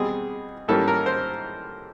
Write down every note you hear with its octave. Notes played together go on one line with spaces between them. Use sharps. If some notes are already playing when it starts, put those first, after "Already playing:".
Already playing: B2 G3 C4 G#4
G#2 E3 G3 A#3 C#4 A4
A#4
C5